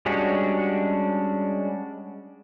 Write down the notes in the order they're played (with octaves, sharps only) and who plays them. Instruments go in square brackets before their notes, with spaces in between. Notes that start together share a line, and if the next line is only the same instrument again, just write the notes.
[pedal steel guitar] G3 G#3 C#4 D4 F#4